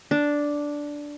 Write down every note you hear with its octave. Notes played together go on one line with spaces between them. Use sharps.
D4